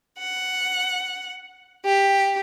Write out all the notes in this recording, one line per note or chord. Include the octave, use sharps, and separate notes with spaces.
F#5
G4